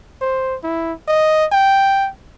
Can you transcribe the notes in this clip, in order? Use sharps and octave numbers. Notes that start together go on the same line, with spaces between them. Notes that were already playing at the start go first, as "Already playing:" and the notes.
C5
E4
D#5
G5